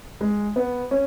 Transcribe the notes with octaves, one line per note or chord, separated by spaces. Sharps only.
G#3
B3
C#4